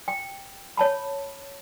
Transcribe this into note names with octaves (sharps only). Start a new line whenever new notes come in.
G5
C#5 A5 B5